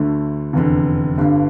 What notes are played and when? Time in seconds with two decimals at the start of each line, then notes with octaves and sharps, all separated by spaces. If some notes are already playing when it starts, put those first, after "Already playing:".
Already playing: D2 D3 A3
0.53 F1 E2 D3
1.18 G1 G2 D3